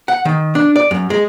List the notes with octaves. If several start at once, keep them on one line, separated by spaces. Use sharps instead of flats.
F#5
D#3
D4
D5
F#2
G#3